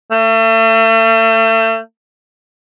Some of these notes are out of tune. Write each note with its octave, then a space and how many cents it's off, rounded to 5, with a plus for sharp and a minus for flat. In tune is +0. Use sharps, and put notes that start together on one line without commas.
A3 +35